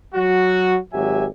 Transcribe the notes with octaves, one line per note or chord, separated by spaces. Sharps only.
F#3 F#4
G#1 F#3 G4 E5 G#5